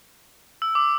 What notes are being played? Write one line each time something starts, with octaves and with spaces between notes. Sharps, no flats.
E6
D6